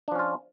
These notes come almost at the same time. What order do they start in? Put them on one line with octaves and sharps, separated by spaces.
D4 F3 C#4 F4